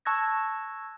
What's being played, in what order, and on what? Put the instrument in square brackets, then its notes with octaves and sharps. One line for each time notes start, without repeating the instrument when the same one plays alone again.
[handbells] A5 C#6 E6 F#6 G#6 A#6